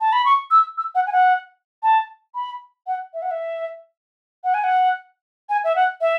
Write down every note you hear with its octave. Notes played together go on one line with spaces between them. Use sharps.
A5
B5
C#6
E6
E6
F#5
G#5
F#5
A5
B5
F#5
E5
F#5
E5
F#5
G#5
F#5
G#5
E5
F#5
E5